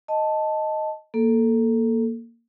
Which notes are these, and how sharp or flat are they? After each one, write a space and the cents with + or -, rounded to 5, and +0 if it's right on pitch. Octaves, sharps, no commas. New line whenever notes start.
D#5 +0 A5 +0
A#3 +0 A4 +0